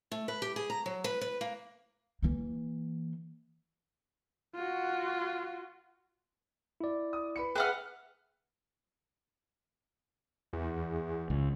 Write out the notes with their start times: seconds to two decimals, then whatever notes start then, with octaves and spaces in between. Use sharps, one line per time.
0.11 A3
0.28 B4
0.42 G4
0.56 G#4
0.70 A#5
0.86 F#3
1.04 B4
1.21 B4
1.41 A#3
2.22 E3 A#3
4.55 F4 F#4
6.81 E4 D5
7.13 D#6
7.36 B4 B5 C#7
7.56 G#4 B4 E5 F#5 G5 F6
10.53 E2
11.30 C#2